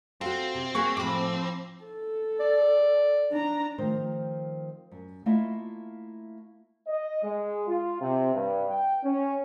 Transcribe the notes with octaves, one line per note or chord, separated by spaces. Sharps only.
C4 F#4 A4 F5
C3
A#3 F#4 G#4
A2 F3 B5 D6
A4
D5
D4 A#5
D#3 F3 A3 C4 C5
F#2
A3 A#3 E4 F4 D#5 E5
D#5
G#3
F4
C3
G2
G5
C#4